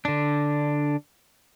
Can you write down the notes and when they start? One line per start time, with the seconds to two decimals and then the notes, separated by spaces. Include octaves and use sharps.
0.05 D3 D4